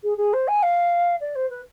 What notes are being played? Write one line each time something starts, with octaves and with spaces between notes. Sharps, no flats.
G#4
G#4
C5
G#5
F5
D5
C5
B4